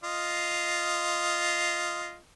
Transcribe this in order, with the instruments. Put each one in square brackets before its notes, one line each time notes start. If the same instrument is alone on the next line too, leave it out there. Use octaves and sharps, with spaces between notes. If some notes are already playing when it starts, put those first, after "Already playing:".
[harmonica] F4 D#5